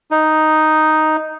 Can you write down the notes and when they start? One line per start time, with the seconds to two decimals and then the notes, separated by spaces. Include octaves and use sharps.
0.11 D#4